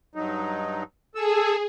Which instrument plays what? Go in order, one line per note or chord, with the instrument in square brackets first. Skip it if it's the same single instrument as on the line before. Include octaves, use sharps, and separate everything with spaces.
[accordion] G2 F#3 D#4
[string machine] G#4 [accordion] A4 E6